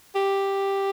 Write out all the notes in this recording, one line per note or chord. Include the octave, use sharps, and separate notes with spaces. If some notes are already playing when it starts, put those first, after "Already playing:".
G4